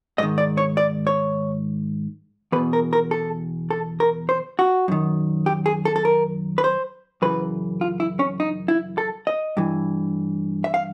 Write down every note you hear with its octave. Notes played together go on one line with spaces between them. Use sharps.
G#2 D#3 D#5
D5
C#5
D5
C#5
E2 B2 B4
A#4
A#4
A4
A4
A#4
C5
F#4
F#2 D#3
G4
G#4
A4
A4
A#4
B4
C5
F#2 C#3 E3 B4
F4
E4
C#4
D#4
E4
A4
D#5
G2 E3
E5
F5